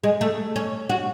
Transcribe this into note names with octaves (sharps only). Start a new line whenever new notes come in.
G#3
A3
C#4
F#4